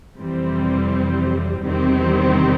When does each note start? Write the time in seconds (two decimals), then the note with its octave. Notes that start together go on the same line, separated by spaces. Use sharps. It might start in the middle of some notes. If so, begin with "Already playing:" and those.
0.17 F2 C3 E3 G3 C4
1.63 E2 C3 D#3 G3 C4